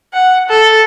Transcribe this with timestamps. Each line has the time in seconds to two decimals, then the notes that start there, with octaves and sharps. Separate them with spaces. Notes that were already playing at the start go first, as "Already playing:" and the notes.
0.14 F#5
0.49 A4